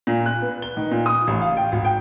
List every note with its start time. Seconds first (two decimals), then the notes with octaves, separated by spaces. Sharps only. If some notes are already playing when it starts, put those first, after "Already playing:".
0.07 A#2
0.26 F#6
0.42 B3
0.62 G7
0.77 D#3
0.91 A#2
1.06 D#6
1.27 A1
1.41 F5
1.57 G5
1.72 G#1
1.85 G5